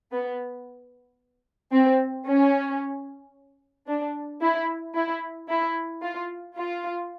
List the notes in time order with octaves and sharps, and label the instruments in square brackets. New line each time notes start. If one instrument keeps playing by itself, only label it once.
[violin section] B3
C4
C#4
D4
E4
E4
E4
F4
F4